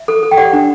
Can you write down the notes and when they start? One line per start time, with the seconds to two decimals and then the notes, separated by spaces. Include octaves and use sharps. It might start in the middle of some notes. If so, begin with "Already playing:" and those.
Already playing: E5
0.08 A4
0.23 A4
0.31 G5
0.37 G4 D5 F#5
0.53 D4